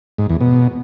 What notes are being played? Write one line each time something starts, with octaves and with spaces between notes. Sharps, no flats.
G#2
E2
B2